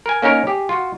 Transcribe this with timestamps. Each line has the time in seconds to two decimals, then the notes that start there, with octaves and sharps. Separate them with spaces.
0.06 A#4 G#5
0.22 A#3 C#4 D#4 A#4 C#5
0.47 G4 G#4
0.69 F4 F#4